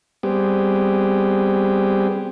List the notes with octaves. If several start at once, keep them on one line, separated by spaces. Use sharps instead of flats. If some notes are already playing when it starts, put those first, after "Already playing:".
G3 B3 C4 G4 G#4